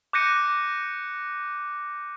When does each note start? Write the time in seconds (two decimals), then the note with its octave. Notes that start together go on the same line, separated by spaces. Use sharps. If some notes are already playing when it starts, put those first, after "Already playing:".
0.13 D6 F#6 G6 A#6 C#7 D#7